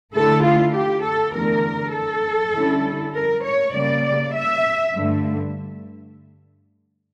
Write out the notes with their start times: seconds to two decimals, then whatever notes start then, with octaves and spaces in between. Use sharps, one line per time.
0.14 D3 A3 E4 A4
0.43 F4
0.74 G4
1.03 A4
1.34 E2 D3 A3 A#4
1.93 A4
2.53 D3 G3 C#4 E4
3.14 A#4
3.43 C#5
3.73 C#3 G3 A#3 D5
4.34 E5
4.94 G2 D3 A3